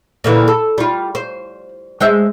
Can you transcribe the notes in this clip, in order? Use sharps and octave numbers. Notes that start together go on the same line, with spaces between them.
A#2 D3 E3
A4
G3 F4
C5
G#3 C5 E5